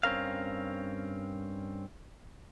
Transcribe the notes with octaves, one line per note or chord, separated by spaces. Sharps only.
G2 C4 C#4 A#4 F5